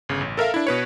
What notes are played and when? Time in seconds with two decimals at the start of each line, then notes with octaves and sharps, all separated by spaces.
0.09 G1 C#3
0.21 A1
0.37 A4 A#4 E5 F5
0.54 D4 E4
0.67 B2 B4 C#5